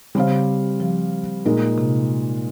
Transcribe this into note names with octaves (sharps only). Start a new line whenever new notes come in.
C#3 G3 C4 G4 C5 F5
F3
A#2 G#3 D#4 A#4
C3